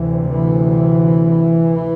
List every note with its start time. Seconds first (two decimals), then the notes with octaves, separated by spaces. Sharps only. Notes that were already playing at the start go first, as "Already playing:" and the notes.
Already playing: D2 C3 E3
0.31 E3